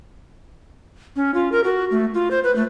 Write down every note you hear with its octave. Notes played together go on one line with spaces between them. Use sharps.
C#4
F4
A#4
F#4
A3
F4
C5
B4
A3